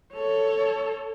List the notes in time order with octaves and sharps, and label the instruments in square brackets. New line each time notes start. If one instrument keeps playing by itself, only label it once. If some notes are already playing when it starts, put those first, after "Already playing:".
[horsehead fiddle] A4 C#5